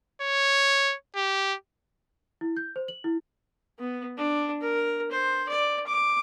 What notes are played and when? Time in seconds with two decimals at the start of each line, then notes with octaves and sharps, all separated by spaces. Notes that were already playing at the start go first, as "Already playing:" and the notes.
0.22 C#5
1.16 G4
2.41 E4
2.57 G6
2.76 C5
2.88 F#7
3.04 E4
3.79 B3
4.17 D4
4.61 A#4
5.11 C5
5.49 D5
5.87 D6